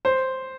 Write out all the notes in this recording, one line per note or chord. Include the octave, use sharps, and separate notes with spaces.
C5